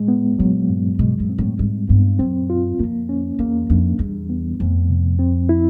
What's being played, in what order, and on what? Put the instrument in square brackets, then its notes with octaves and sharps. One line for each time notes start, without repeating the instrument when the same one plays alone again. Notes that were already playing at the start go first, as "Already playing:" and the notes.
Already playing: [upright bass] A2 [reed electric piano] G#3
[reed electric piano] B3
[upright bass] A#2 [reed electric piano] F#3
[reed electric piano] G2
[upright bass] B2 [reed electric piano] G#3
[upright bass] A#2
[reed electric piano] C4
[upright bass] A2
[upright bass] G#2 [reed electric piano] G3
[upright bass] G2 [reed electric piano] B3
[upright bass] F#2 [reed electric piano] C4
[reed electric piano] F4
[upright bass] F2 [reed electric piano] A#3
[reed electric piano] C#4
[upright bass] E2 [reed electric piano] A#3
[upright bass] F2 [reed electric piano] D4
[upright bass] E2 [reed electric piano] G3
[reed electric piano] B3
[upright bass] F2 [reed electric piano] A3
[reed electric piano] C3
C4
E4